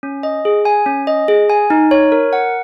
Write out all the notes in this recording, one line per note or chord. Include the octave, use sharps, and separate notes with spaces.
C#4
D#5
G#4
G#5
C#4
D#5
G#4
G#5
D#4
C#5
A#4
F#5